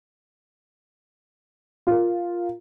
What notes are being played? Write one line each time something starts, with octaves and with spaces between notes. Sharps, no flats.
F4 A#4